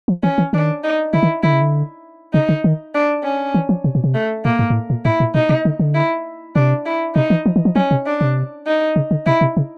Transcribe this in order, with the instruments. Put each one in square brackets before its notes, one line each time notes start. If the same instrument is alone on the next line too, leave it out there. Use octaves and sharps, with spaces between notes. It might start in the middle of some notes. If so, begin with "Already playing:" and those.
[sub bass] F3
[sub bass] E3 [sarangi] C#4
[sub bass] E3
[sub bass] D#3 [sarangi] D4
[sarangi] D#4
[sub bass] D3 [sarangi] E4
[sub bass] D#3
[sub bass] D3 [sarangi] E4
[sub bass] C#3
D3
[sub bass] C#3 [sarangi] D#4
[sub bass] D3
D#3
[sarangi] D4
C#4
[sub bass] E3
F3
C3
B2
C3
[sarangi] A3
[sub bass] A#2 [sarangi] A#3
[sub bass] G#2
G#2
A2
A#2
[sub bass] A2 [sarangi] E4
[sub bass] A#2
[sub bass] B2 [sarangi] D#4
[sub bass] C3
D3
D3
[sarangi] E4
[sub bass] C3 [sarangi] D4
[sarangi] E4
[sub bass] C3 [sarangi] D#4
[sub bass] E3
F3
E3
F3
[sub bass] F#3 [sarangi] C#4
[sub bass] C3
[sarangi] D4
[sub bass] C3
[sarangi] D#4
[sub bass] C#3
D3
[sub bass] C3 [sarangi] E4
[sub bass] C3
C#3